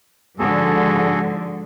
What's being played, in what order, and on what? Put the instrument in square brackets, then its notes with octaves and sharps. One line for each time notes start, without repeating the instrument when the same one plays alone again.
[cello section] G#2 D3 F3 [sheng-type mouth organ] F#4 G#4 A4